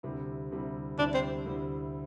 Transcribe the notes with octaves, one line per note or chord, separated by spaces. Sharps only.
D2 C3 G3 E4
D2 C3 G3 E4
D2 C3 G3 D4 E4
C4
D2 C3 G3 E4